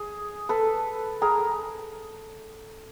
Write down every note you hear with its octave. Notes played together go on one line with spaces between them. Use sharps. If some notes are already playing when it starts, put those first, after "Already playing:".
Already playing: G#4
A4 B4
G#4 A#4